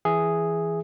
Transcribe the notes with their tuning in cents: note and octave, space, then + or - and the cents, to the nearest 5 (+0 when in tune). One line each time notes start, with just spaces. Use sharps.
E3 +0 G#4 +0 E5 +0